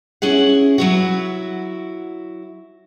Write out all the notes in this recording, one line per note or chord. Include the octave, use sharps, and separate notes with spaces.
C#4 E4 G#4 F#5
F#3 E4 F#4